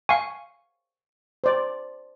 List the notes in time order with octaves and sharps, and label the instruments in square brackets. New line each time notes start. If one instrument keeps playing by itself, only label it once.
[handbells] F5 G#5 [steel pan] C#6
[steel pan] C5 D5